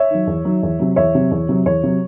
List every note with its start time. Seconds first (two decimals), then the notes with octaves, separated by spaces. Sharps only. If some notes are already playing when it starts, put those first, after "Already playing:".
Already playing: C#5 E5
0.10 D#3 F#3
0.27 E2
0.45 D#3 F#3
0.63 E2
0.80 C3 F#3
0.96 E2 C#5 E5
1.15 C3 F#3
1.31 E2
1.49 C3 F#3
1.66 E2 C#5
1.83 C3 F#3